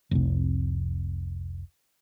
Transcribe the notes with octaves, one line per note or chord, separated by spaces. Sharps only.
F1 C2